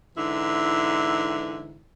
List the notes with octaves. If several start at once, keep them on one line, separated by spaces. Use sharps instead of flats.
G#2 D3 E3 E4